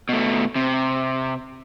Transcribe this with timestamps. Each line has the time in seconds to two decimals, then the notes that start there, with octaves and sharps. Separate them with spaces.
0.09 B2 A3
0.55 C3